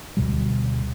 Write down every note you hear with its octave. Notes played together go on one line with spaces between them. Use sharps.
D2 B2 G3